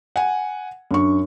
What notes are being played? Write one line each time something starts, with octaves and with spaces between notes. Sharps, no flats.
F#5 G#5
F#2 D4 C#6